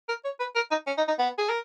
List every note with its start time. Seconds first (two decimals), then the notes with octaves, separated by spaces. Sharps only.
0.09 A#4
0.24 C#5
0.40 B4
0.55 A#4
0.71 D#4
0.87 C#4
0.97 D#4
1.08 D#4
1.18 B3
1.38 G#4
1.49 A#4